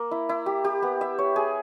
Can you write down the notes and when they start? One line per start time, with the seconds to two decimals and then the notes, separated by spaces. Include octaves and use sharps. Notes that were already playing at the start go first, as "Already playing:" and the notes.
Already playing: A#3
0.11 E4
0.29 E4
0.46 G4
0.64 G4
0.82 B3
1.01 E5
1.19 C#5
1.36 G#4